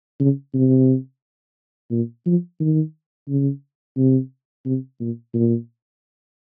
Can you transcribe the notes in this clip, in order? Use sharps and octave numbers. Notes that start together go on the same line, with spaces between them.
C#3
C3
A#2
F3
D#3
C#3
C3
C3
A#2
A#2